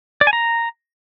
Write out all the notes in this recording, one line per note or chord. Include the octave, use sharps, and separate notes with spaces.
D5
G#5
A#5